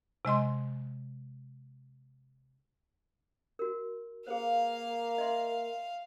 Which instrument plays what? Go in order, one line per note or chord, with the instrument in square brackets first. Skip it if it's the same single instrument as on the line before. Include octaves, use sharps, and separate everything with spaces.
[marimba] C3 G#3 D#5 C6
[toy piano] F#4 A#4
[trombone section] A#3 [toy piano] G#4 B4 C5 [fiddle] F5
[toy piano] D#5 E5 C6